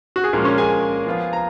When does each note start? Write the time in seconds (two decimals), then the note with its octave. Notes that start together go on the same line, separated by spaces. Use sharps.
0.16 F#4
0.24 G#4
0.33 A#2 F3 G#3 A#3 C#4 A#4
0.44 C#4 C#5
0.57 G#4 G#5
1.07 F3 B3 F4
1.33 A#5